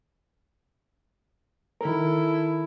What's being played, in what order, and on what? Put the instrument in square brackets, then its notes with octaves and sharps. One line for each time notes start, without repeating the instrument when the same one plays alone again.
[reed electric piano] D#3 A#4 [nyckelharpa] E4 A4